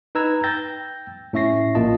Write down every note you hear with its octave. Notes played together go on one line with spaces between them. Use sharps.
D#4 B4 A#5 E6 G#6
G5 E6 G6 A6 A#6
A2 C#4 E5 C#6 A#6 C7
A#1 A#2 A#3 F4 D#5 A5